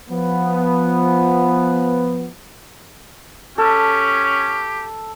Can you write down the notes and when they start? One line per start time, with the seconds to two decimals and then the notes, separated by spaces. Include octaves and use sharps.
0.10 F3 B3
3.58 C#4 G4 A4